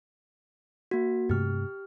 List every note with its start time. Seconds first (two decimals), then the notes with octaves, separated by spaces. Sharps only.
0.91 A#3 F#4
1.30 G2 C3 A3 G4 F6